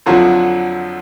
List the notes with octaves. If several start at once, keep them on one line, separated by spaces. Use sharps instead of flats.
F2 D3 F3 F#3